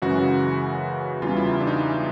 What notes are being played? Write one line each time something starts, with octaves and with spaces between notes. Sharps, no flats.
F#2 C#3 E3 G#3 F#4
E2 C#3 E3 G3 F4
E4
D4
D#4